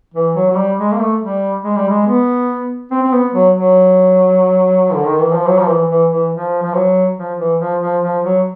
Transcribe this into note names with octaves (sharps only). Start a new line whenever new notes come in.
E3
F#3
F#3
G3
G#3
A#3
A3
G3
G#3
G3
G#3
B3
C4
C4
B3
F#3
F#3
D3
D#3
E3
F3
F#3
F3
E3
E3
E3
F3
F3
F#3
F3
E3
F3
F3
F3
F#3